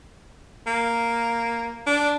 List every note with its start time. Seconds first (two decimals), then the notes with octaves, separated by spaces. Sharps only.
0.67 A#3
1.86 D4